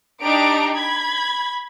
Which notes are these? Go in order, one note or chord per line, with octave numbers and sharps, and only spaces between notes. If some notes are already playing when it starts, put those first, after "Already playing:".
D4 D#4 G4 A#5 D7
B5 G#6